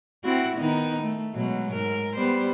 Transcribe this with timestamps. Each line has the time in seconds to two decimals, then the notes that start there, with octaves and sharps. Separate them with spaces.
0.24 C4 E4 F#4
0.56 D#3 B3 D#4
1.02 A3
1.34 B2 F#3 G#3
1.72 G#2 A#4
2.15 G3 B3 C5